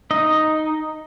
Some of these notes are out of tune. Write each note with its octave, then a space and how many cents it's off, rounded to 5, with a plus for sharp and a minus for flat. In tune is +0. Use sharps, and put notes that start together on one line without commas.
D#4 +0 D#5 +0